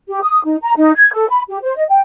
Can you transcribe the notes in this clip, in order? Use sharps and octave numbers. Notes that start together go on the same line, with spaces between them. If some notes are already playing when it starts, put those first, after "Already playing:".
G4
D#6
D#4
A#5
D#4
G#6
A4
B5
G4
C5
D#5
G5